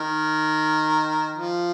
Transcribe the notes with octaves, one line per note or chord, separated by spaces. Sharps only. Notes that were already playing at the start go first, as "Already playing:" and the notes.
Already playing: D#3
F3